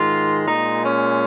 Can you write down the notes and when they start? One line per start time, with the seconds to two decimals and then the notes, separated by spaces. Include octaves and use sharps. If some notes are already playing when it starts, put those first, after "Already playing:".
Already playing: G#2 D#3 G#3 F4
0.46 A#2 G#3 D#4
0.83 C#4